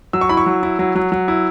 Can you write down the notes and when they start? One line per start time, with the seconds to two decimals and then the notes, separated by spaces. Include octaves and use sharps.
0.13 F#3 E6
0.21 C#6
0.29 E4 B5
0.37 C#6
0.46 F#3
0.63 E4
0.79 F#3
0.95 F#3
1.12 F#3
1.28 E4